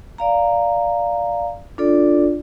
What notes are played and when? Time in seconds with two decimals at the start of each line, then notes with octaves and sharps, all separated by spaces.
0.18 D5 F5 A#5
1.78 D4 F4 A4 D5